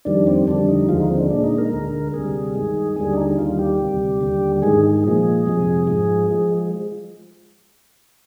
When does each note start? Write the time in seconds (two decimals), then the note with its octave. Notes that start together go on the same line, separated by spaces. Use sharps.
0.05 F2 D#3 G3 D4
0.27 C4
0.47 F2 D3 G3 D4
0.68 D#4
0.89 D#2 D3 F3 G#3 F4
1.00 D#4
1.10 C4
1.20 D4
1.30 A#2 G#3 D4
1.44 D#4
1.58 A#4
1.72 D2 D3 G#3
2.14 D2 C3 G3 G#4
2.55 G2 D#3 G#3
2.96 D#2 D3 G3 G#4
3.13 D4
3.17 D#4
3.39 D#2 D#3 G3 F4
3.59 G4
3.80 D2 C3 G3
4.21 D#2 D3 G3
4.62 G#2 D#3 G#3 G#4
5.04 A#2 F3 G#3 G#4
5.46 F2 C3 F3 G#3
5.87 G#2 F3 G#3
6.30 F3 G#3